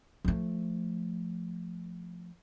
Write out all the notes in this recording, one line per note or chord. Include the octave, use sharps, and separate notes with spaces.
F3 A3